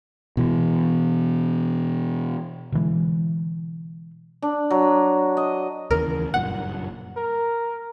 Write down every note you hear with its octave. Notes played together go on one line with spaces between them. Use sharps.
B2 E3
B2 D3 E3 G#3
D4
F#3
D#5
D#2 C#3 E3 A#4
F#1 G2 A#2 F#5
A#4